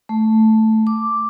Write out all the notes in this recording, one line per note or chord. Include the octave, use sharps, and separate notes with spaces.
A3
D6